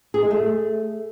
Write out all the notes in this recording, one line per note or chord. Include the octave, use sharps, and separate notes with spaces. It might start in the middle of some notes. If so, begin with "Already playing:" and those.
G#4
G#3
A3